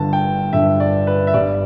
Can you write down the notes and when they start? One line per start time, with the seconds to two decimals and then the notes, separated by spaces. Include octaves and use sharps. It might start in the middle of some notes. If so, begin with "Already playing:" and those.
Already playing: G1 G2 D3 A5
0.13 G5
0.53 G1 G2 D3 E5
0.80 D5
1.07 B4
1.27 E5
1.34 G1 G2 G3 D5